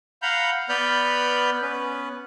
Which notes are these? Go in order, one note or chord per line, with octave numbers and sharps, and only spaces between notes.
F5 F#5 A#5 B5 F6 G6
B3 B4 D5 B5 F6 G6
B3 C#4 B4